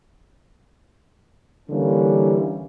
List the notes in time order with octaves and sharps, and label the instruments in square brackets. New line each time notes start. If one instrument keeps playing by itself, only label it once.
[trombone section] D3 E3 G3 A#3 C#4